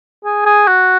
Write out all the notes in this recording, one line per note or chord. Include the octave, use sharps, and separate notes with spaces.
G#4
G#4
F#4